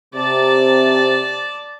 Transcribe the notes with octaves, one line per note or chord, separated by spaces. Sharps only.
C3 D5 A5